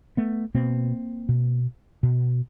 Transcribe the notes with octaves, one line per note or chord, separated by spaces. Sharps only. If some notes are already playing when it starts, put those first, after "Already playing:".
A3 B3
B2 A#3 C4
B2
B2